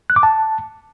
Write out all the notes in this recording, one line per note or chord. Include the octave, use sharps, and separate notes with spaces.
F#6
D6
A5